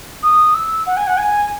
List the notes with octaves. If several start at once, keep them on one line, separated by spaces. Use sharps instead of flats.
D#6
E6
F#5
G#5
F#5
G#5